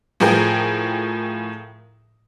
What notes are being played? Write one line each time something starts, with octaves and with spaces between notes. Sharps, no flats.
A2 F3 G#4 A#4 G5